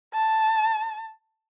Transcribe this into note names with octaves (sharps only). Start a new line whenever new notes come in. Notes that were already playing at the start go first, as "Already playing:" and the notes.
A5